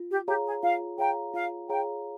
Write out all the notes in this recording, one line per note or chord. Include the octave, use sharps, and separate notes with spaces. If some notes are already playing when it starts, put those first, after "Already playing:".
Already playing: F4
G4
G4 G#4 C#5 F5 A#5
G#4
F4 F5
G#4 C#5 F5 G5 A#5
F4 F5
G#4 C#5 F5 G5 A#5